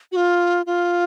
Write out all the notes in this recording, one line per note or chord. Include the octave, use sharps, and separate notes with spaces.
F#4
F4
F4